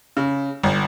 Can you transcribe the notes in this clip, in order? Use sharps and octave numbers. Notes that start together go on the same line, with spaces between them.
C#3
G1